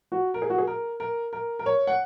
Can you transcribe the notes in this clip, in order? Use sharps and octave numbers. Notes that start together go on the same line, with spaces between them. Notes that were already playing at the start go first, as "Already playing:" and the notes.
F#4
A#4
G#4
F#4
G#4
A#4
A#4
A#4
A#4
C#5
F#5